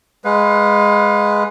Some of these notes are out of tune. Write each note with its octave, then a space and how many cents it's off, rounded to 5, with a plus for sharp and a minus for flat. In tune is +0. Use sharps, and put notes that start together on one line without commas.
G#3 +0 B4 +0 F5 +30